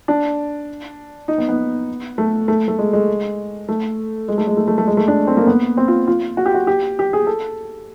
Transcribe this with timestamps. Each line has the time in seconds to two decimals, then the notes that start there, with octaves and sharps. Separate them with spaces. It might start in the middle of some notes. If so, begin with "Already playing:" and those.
0.08 D4
1.28 D#4
1.38 B3
1.49 B3
2.18 A3
2.48 A3
2.68 A3
2.79 G#3
2.93 G#3
3.69 A3
4.28 G#3
4.38 A3
4.47 G#3
4.57 A3
4.68 A3
4.78 A3
4.88 G#3
4.97 A3
5.08 D4
5.27 C4
5.37 A#3
5.47 B3
5.77 C4
5.88 F4
6.08 F4
6.37 F#4
6.46 G4
6.54 F#4
6.67 G4
6.99 G4
7.13 G#4
7.27 A4